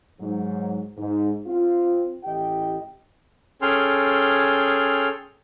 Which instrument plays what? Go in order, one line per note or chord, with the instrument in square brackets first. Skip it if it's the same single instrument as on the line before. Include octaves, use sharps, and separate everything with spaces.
[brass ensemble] G#2 F#3
G#2
C4 F4
A1 E4 G4 D#5 G5
[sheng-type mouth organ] C#4 G#4 A4 G5 C6 F6